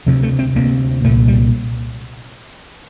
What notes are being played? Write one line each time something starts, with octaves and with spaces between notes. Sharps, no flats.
D2 C3 F3
A3
C4
D2 C3 A#3
C2 A#2 A3
G3